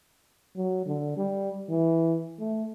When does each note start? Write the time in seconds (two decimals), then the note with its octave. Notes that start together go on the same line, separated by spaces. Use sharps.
0.56 F#3
0.86 D3
1.17 G3
1.69 E3
2.39 A3